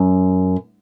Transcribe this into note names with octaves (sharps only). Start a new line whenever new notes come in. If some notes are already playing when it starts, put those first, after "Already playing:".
Already playing: F#2